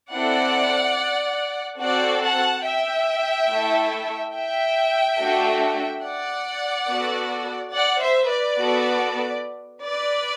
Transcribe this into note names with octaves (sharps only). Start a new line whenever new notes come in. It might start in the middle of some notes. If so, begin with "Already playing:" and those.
C4 E4 A4 D5 F#5
C4 F#4 A4 D5 F#5
F#5 A5
E5 G5
A3 E4 A4
E5 G5
A3 D4 F#4 A4
D5 F#5
B3 F#4 A4
D5 F#5
C5 E5
B4 D5
B3 F#4 A4
B4 D5